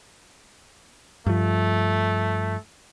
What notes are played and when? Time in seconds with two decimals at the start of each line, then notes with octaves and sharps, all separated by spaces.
1.27 G2 F3 A3